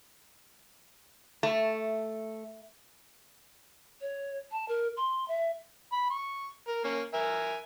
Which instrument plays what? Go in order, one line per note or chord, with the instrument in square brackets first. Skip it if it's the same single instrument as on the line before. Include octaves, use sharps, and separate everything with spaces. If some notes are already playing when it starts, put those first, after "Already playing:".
[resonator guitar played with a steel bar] A3
[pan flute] C#5
A5
A#4
C6
E5
[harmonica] B5
C#6
A#4
A#3 C#4
A#4 E5 G#5